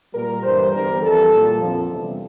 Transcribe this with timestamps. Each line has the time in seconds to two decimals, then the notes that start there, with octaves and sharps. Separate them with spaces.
0.14 A#2 G3 A#4
0.43 G2 E3 G3 C5
0.72 E2 D3 G3 A#4
1.01 F2 E3 G3 A4
1.30 A#2 G3
1.59 F2 D3 F3
1.88 E2 C3 G3